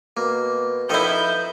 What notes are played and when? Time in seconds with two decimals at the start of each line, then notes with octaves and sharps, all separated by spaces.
0.17 B2 A#3
0.89 D#3 F3 E4 A4 B4 D#5 E5 G6